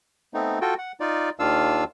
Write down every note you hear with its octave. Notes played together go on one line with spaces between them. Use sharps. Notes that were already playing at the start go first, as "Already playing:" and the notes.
A3 B3 C4 D#4
F4 F#4 A4 G5
F#5
D#4 F4 D5
D#2 D#3 D4 F4 F5 E6